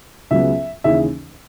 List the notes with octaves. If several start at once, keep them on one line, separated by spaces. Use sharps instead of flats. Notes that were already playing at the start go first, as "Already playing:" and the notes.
C#2 C#3 F#3 B3 E5
D#2 C#3 E3 E5